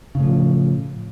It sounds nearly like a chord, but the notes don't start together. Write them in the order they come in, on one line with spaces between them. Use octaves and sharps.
C#3 A2 F3